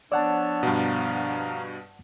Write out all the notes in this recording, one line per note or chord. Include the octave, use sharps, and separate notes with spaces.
F3 B3 D4 C#5 D5 F#5 A5 E6
G2 B2 F5 A#5